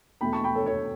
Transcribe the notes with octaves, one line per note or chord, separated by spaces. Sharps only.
E2 B2 A3 G5 B5
A5 C#6
G5 B5
A4 C#5
A4 C#5